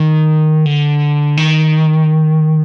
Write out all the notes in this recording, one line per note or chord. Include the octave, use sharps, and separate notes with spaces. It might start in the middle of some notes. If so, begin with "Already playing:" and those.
Already playing: D#3
D3
D#3